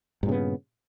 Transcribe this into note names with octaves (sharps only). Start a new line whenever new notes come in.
G2 A#2 C#3 B3